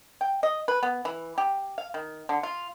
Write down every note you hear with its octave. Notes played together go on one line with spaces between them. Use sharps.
G5
D#5
B4
B3
E3
G4
F5
D#3
D3
F4